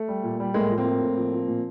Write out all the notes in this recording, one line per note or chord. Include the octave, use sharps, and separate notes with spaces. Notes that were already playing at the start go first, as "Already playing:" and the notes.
Already playing: A3
G3
A#2
G3
A2 G#3 A#3
F3
A#3 C4
A2
A2
F3
F3
A#2